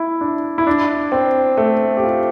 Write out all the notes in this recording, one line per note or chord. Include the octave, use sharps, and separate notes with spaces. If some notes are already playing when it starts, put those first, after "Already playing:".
Already playing: E4
D4
E4
D4
C4
A3
G4
F4